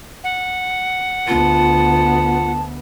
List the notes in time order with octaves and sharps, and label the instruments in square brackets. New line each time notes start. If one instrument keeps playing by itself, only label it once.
[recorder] F#5
[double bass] D2 B3 [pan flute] F4 [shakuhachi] A5